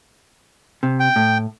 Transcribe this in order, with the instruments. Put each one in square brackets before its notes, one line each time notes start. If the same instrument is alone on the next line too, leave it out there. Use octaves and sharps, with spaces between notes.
[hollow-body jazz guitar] C3
[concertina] G5
[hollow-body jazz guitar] A2